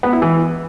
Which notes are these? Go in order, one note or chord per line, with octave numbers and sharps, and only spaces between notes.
B3
E4
E3